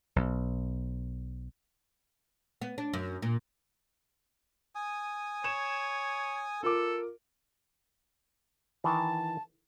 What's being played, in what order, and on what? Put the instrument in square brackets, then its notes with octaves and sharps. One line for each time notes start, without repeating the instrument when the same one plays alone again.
[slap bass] B1
[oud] B3
D4
F#2
A#2
[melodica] G#5 D#6
[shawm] C#5 [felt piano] E7
[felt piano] F4 A#4 D6 [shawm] A4
[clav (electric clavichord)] D#3 E3 [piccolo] A5